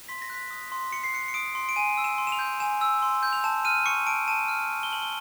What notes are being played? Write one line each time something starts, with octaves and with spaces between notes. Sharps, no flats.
C6 B6
A#6
F#6 B6
D#6
C6
C6 C#7
C7
F#6 C#7
C#7
D#6 D7
C6
D7
G#5 D#7
E6
E7
C6
E7
F7
G6
G#5 E7
E6
C6
G6
F7
A5 E7
F6 D#7
C#6 C#7
A5 D7
A5 D#7
F6
C#6
G7
A5 F#7
G7